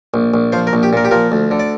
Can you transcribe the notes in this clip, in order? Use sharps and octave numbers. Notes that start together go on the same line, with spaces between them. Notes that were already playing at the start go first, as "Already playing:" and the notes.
A#1
A#1
F3 C5
A#4
A#1
G4
A#2 A#4
G4
F3 A#4
D2
D3
D5